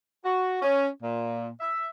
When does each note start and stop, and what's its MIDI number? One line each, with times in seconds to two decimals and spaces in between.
0.24 0.62 66
0.62 0.87 61
1.02 1.47 46
1.60 1.87 76